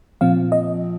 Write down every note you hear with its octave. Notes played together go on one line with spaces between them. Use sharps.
A#2 F3 C4 F5
D#5